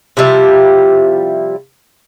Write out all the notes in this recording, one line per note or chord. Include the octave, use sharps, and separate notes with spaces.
C3 F3 G3 E4